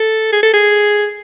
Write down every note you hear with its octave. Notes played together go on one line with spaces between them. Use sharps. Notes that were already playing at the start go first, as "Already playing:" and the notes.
Already playing: A4
G#4
A4
G#4